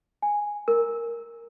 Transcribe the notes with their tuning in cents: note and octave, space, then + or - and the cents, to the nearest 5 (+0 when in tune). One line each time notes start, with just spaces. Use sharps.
G#5 -5
A#4 -5